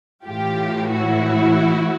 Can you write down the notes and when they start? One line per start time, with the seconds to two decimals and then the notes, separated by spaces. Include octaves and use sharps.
0.25 A2 E3 F4 G4
0.91 E4 F#4